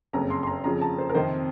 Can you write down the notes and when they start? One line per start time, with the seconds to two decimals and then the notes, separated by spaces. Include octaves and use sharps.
0.13 F#1 F2 C#3 A#5
0.30 C6
0.43 C6
0.47 A#5
0.64 F2 C#3 F3 A#5
0.82 A5
0.98 C5
1.09 A#4
1.15 F2 C3 D#3 C5